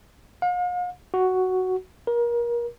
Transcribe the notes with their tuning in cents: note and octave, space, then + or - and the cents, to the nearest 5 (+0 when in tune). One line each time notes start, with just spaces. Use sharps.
F5 +45
F#4 +5
A#4 +30